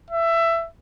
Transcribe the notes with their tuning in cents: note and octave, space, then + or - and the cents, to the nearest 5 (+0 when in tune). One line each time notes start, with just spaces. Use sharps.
E5 +15